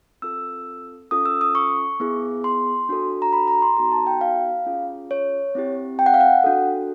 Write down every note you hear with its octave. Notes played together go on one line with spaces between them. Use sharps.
C4 F4 A4 E6
C#4 F4 A4 D#6
E6
D#6
C#6
B3 E4 G#4
C6
D4 F#4 A4
A#5
B5
A#5
C6
B3 D#4 F#4 A4 A#5
A5
G5
F5
C#4 F4 G#4
C#5
C4 E4 G4
G5
F#5
F5
F#5
D4 F#4 A4